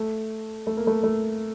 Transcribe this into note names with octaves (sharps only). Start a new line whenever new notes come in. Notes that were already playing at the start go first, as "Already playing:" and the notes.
Already playing: A3
A3
A#3
A3
A3